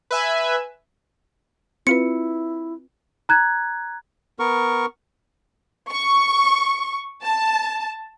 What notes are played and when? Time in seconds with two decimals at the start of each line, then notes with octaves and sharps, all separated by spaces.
0.11 B4 E5 G#5
1.87 C4 E4 F4 B4 C#7
3.29 A#5 F#6 G#6
4.39 B3 A#4 C#6
5.90 C#6
7.23 A5